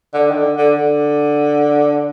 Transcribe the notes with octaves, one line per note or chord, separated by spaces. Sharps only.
D3
D#3
D3
D3
D3